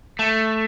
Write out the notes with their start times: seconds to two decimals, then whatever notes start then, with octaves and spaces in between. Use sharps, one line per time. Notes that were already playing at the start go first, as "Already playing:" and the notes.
0.19 A3